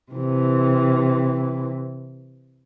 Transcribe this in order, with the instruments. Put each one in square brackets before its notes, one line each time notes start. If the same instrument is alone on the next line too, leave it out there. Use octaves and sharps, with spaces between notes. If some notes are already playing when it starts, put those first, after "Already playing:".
[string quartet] C3 E3